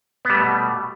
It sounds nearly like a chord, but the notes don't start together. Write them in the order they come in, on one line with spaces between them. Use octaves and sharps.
B3 G3 A3 B2